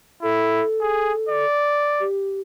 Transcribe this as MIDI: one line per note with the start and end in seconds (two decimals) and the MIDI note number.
0.23 0.64 64
0.23 1.45 69
0.81 1.13 68
1.29 2.06 74
2.00 2.41 67